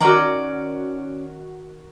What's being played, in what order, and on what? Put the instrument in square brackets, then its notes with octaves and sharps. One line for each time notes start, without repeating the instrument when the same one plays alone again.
[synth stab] D#3 F#4 [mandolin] C#4 D5 A#5